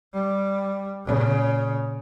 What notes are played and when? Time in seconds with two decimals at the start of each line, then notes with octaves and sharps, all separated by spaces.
0.13 G3
1.05 A#2 C#3